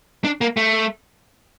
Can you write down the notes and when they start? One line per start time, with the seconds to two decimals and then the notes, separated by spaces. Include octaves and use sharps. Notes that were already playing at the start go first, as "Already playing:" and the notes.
0.24 D4
0.41 A#3
0.57 A3